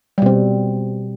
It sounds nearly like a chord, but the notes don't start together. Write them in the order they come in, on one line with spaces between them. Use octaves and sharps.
G3 B2 C4